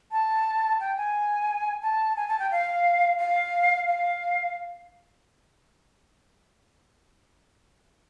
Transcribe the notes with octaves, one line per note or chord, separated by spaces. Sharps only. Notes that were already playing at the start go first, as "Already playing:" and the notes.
A5
G5
G#5
A5
G#5
A5
G5
F5
F5
F5